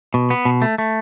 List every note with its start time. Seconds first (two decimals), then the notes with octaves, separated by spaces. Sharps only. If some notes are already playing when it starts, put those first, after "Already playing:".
0.14 B2
0.30 B3
0.45 B2
0.62 A3
0.78 A3